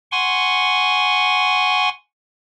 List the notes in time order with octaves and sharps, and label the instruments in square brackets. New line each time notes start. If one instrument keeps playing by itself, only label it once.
[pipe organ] F#5 G#5 C6 C#6